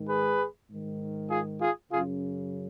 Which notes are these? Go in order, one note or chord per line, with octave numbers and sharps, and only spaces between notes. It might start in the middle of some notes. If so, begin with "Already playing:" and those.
Already playing: G#2 D#3
G#4 B4
G#2 D#3
F4 G#4
F4 G#4
F#2 C#3 F4 G#4